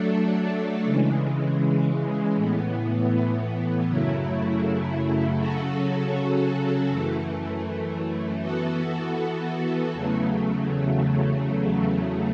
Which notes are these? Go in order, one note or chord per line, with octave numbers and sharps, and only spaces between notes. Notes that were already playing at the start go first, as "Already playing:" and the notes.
Already playing: F#3 A3 D4 A4
C#3 E3 G#3
A2 E3 B3
F#2 C#3 F#3 A3 E4
C#3 F#3 C#4 F#4 A4
F#2 E3 A3
E3 B3 F#4 A4
E2 C#3 F#3 A3